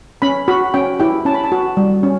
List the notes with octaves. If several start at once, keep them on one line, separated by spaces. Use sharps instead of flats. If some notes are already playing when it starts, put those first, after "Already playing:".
C#4 B5
F#4 B5
C#4 G5
E4 G4 G5
C#4 A5
B5
A5
F#4
G3
C#4